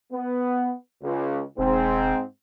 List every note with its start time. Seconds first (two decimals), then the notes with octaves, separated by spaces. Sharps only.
0.12 B3
1.03 C#2
1.59 E1 G#2 C4